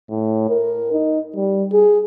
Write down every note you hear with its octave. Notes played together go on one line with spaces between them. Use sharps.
A2
A#4
D#4
G3
G#4